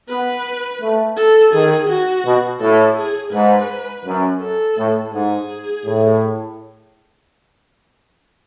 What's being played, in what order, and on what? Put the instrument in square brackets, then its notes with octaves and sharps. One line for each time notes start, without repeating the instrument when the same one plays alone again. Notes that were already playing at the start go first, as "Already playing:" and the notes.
[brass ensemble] B3 [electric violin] B4
[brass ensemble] A3
[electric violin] A4
[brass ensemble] D#3 [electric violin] G#4
[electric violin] F#4
[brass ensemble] B2
[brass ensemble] A2 [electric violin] A4
[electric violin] G#4
[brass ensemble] G#2 [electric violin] B4
[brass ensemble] F#2
[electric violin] A4
[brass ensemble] A2
[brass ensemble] G#2 [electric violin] G#4
[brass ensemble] A2